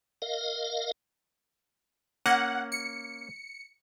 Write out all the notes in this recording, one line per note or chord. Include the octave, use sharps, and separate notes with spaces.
A#4 D#5 F5
A#3 C#4 F#5
C#7